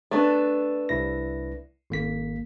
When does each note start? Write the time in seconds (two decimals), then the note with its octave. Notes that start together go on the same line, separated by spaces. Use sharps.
0.11 A3 B3 D4
0.89 C2 E4 A#6
1.90 G#1 A#3 B6